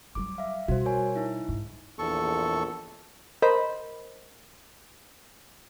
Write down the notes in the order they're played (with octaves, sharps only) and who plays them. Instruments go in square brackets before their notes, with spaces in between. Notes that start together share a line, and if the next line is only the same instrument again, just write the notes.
[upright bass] F#3 G3 [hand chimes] D6
[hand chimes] E5 F5
[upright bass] B2 G3 [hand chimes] F#4 C5
[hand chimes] A#4 C#5 G#5
D#4 E4
[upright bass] G#2
[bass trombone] A#1 [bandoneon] E2 A4 C#6
[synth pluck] A#4 C5 D#5 B5